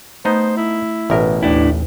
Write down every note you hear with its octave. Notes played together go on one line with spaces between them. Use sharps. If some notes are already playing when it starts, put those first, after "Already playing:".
A3 B3 D#4 C5
E4
A1 B2 A#4 B4 D5 E5
D#2 A2 D4 E4 D5